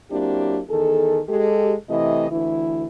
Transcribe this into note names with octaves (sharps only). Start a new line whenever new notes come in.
F#3 A#3 C4 D4 E4 G4
E2 D#3 G#4 A4
G#3 G4 A4
C3 E3 A3 E4 D#5
D2 E3 E4